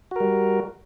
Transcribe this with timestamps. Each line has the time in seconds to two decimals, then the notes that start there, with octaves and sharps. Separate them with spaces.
0.11 F#4
0.16 A#4
0.20 G3